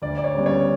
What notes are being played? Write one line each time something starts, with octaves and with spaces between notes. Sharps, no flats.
D2 D5
D5
C#5
C#3 G3 B3
C#5